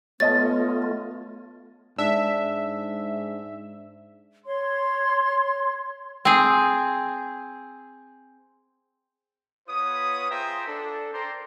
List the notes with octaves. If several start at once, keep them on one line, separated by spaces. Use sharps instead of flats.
A3 B3 F4 C#5 D#5 A5 A6
G#2 D4 E5
C#5 C6
C4 G#4
B3 F4 B4 C#5 D#6
F4 G#4 C5 E5 G5 A#5
D4 A4
A#4 C5 D5 G5 A#5 C6